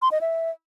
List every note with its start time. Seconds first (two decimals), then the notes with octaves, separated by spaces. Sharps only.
0.02 C6
0.12 D#5
0.21 E5